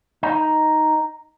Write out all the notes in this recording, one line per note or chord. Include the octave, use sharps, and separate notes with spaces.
D#4